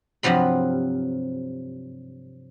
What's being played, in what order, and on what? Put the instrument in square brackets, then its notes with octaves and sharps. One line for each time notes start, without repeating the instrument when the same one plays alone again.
[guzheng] G2 C3 F3 F#3 B5